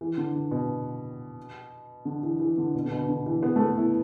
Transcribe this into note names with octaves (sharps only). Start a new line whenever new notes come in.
E3
D3
D3
B2
D3
E3
E3
D3
B2
D3
B2
D3
E3
B3
A3
B3
E4